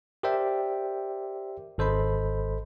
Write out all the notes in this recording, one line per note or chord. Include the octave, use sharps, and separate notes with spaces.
G4 A#4 C5 D5 E5 G5
G#1 A4 C5 D#5 B5